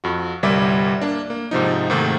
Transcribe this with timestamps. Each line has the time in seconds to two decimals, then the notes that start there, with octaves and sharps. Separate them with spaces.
0.04 F2 F#4
0.43 G1 C2 G3 A#4 E5 D6
1.01 A#3 D4
1.30 A#3
1.51 G#2 C3 F3 D#4
1.90 G#2 C3 D#3 A3 A#3